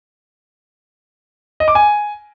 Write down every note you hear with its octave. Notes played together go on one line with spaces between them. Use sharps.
D#5
D6
G#5